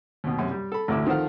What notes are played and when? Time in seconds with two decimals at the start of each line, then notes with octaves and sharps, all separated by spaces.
0.24 D#2 B2
0.39 F#2 C3
0.51 G3
0.72 A4 B5
0.88 A1 D2 E4 D6 E6
1.07 D#3 F3 A4 C5 F#5 F6